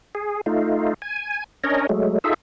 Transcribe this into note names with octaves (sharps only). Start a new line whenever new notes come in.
G#4
A3 D#4 F4
G#5
C#4 D4 A#4 C#5 D#5
F#3 G#3 A3
D#4 F4 G#4 A4 E5